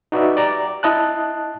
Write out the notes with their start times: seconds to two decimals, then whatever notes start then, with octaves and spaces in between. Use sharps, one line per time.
0.12 D#4 F#4 B4 D5 E5
0.36 G4 D5 A#5
0.83 E4 D#5 A5 F#6